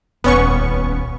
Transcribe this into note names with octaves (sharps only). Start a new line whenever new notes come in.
D#1 C#2 B3 C#4 C#6